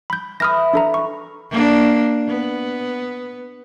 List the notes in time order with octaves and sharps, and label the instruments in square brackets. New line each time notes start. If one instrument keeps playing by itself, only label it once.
[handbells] B5 G6
[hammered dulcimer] E3 B4 [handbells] D#6 F6 A#6
[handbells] D4 A4 A#5
C#6
[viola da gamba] A#3 D4
B3